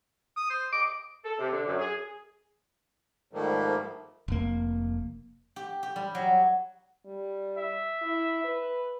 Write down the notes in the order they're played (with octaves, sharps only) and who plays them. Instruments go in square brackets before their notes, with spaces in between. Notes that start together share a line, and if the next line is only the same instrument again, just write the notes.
[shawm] D#6
C5
[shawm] D#5 [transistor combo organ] D6
[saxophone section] A4
C3
D3
F#2
G#4
[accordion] G#2 D#3 F3 G3 A3 A#3
[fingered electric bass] F1 A#3
[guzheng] G4
G4
G3
F#3
[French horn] G3
[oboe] E5
[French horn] E4
B4